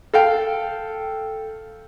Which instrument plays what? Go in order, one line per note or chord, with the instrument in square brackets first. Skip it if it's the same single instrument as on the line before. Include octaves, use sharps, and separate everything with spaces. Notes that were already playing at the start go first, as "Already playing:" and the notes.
[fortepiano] A4 F5 G5